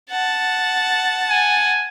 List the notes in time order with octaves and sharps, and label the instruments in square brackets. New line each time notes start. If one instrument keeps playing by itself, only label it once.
[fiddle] F#5 A5
[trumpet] G#5